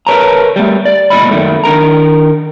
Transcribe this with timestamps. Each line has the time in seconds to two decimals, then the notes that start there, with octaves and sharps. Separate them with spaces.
0.07 A#4 B4 C#5 A5 A#5
0.56 G3 A3
0.85 D5
1.10 C#2 A#2 D4 D5 D#5 B5
1.31 F#2 D#3 A3
1.64 D#3 D4 A#4 A#5